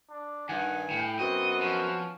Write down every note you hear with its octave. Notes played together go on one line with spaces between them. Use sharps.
D4
G2 D#3 F#5 G#5
A2 G5
F#2 B3 C4 F#4 D#5
F3 C#4